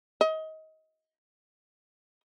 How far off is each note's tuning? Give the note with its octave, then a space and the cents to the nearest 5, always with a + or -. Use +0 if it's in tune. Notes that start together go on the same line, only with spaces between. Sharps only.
D#5 +25